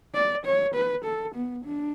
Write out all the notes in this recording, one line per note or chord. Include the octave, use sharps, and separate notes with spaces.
D5
C#5
B4
A4
B3
D4